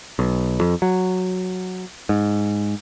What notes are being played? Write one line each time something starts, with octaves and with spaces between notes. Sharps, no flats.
B1
F2
F#3
G#2